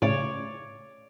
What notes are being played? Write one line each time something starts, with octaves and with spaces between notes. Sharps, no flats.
A2 C#3 C#5 D5